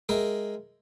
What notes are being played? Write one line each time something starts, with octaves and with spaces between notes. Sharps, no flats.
G#3 A#4 E5 G5